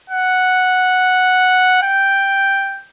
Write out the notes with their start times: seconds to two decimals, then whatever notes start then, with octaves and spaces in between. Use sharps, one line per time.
0.10 F#5
1.83 G5